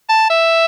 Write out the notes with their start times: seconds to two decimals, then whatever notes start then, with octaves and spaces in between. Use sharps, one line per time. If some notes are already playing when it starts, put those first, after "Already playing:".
0.09 A5
0.30 E5